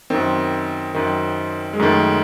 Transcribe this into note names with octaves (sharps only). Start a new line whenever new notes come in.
F#2 D#3 C4
F#2 D#3
G#3
F#2 D#3 A3